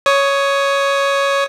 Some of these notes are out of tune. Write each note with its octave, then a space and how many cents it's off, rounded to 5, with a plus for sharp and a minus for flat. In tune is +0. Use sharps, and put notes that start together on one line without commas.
C#5 +5 D#6 +10